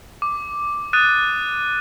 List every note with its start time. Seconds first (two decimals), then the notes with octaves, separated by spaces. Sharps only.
0.22 D6
0.93 D#6 F#6 A6 D#7